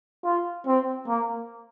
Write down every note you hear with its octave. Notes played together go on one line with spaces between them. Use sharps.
F4
C4
A#3